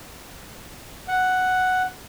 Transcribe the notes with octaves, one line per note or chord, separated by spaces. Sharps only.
F#5